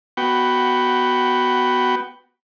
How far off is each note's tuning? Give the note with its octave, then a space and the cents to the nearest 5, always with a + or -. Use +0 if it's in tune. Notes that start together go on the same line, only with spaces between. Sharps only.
B3 +0 F#4 +10 G5 -5